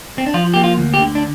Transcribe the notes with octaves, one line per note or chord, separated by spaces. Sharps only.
C4
D4
F3 F4
A#3 G4
F4
D2
G4
D3
D4